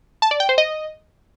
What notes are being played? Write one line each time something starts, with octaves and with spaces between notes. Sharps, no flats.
A5
D5
G5
C5
D#5